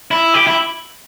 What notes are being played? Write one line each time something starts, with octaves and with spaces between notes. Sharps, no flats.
E4
G4
E4